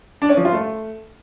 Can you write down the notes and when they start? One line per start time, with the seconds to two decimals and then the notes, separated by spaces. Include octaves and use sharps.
0.22 D4
0.29 C#4
0.37 F3
0.45 F4
0.53 A3